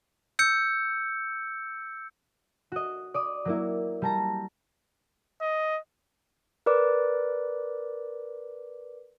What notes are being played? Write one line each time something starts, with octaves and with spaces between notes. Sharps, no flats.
E6 G6 C#7
F#4 D#5
D5 D6 D#6
F#3 A#3 E4
G3 A5 A#5
D#5
A#4 B4 D5 D6